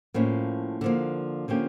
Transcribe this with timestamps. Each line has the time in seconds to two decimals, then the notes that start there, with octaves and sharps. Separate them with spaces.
0.14 A2 F3 A#3 C#4
0.81 D3 F3 A#3
1.48 D3 F3 A#3 C#4 G4